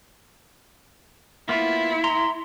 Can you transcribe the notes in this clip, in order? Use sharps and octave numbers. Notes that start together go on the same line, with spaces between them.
A#3 B3 E4 F4
A#5 C6